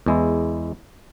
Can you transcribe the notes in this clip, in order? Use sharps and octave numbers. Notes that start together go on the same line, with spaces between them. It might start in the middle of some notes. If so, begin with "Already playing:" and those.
E2 G#3 E4